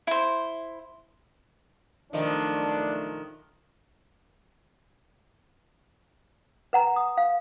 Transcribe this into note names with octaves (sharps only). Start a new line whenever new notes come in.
E4 C5
B1 D#3 F3 A3 D4
B4 F#5 A#5
D#6
F5